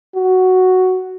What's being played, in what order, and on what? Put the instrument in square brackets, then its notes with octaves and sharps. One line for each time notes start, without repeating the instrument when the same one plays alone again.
[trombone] F#4